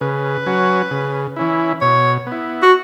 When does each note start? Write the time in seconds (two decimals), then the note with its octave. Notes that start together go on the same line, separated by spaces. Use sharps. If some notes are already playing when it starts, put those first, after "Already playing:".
0.01 C#3 B4
0.46 F#3 C#4 F#4
0.91 C#3
1.36 E3 C#4 E4
1.81 B2 C#5
2.27 B3
2.32 E4
2.62 F#4